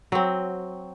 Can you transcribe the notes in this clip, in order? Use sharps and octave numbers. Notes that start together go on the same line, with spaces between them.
F#3 C4